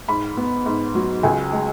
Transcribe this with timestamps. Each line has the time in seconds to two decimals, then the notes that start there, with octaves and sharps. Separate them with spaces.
0.08 G#2 B5
0.37 B3
0.66 G#2
0.95 F#3
1.23 C#2 G#5
1.53 G#3